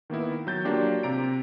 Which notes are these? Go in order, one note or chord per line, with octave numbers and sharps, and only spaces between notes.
D#3 A#3 B3 E4
F#3 G6 A6
F#3 A#3 D4 F4 G4
C3 A#5 D7